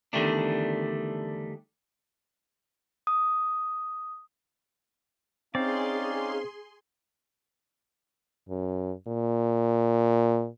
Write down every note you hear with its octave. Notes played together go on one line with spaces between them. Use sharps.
E2 D3 D#3 G3 A3 D4
D#6
C4 C#4 D#4 G#4 D5 F5 C6
F#2
A#2